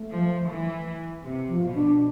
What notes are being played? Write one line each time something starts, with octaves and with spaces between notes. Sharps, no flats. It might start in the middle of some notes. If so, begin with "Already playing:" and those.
Already playing: A3
F3
E3
C3
F3
B2
D4